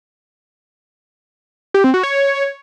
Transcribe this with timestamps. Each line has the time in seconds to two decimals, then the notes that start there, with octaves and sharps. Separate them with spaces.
1.74 G4
1.84 C4
1.94 F#4
2.03 C#5